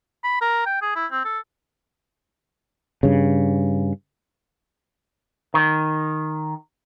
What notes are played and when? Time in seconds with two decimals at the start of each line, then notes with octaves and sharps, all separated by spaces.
0.24 B5
0.41 A#4
0.66 G5
0.82 G#4
0.96 E4
1.11 C4
1.25 A4
3.03 G2 C#3
5.54 D#3